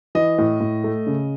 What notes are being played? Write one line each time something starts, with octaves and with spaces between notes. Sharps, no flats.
E3 D#5
A2
A2
A3
C#3